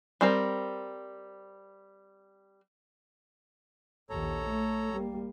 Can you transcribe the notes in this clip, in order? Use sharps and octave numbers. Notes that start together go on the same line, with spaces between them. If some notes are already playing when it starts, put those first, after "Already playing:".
G3 C4 A#4
A#1 D#2 A4 C#5 A#5
A3
G3 A#3